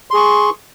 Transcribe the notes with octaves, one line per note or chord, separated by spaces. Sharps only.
G#4 C6 C#6